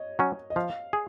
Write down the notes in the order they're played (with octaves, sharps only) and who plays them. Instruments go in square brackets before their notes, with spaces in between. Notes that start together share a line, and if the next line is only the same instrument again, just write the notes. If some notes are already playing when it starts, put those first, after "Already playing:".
Already playing: [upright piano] C#5 D#5
[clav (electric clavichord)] F#3 C#4
[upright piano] D#5
[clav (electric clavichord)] F3 [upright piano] F5
[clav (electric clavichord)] G#4